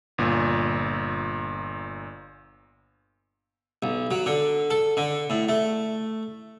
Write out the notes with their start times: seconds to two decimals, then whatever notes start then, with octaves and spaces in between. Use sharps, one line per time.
0.18 G1 A#2
3.83 B1
4.11 F#3
4.26 D3
4.70 A4
4.97 D3
5.30 A2
5.49 A3